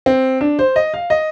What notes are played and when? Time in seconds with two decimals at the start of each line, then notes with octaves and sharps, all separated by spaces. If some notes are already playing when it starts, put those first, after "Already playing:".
0.06 C4
0.41 D4
0.59 C5
0.76 D#5
0.94 F5
1.10 D#5